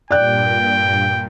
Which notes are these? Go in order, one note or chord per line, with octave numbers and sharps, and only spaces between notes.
G2 A#2 D5 G5 F#6